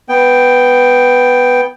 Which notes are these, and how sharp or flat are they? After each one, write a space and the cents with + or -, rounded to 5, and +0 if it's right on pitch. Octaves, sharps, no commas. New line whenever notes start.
B3 +0 G5 +0